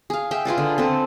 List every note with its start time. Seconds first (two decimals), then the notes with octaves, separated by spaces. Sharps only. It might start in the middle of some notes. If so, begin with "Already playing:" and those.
0.10 G#4 F5
0.31 G#4 E5 G5
0.45 F4 G#4 B4 D5
0.58 D3
0.78 C4 A4 B4